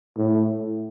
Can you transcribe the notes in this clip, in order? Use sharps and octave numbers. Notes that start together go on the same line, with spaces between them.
A2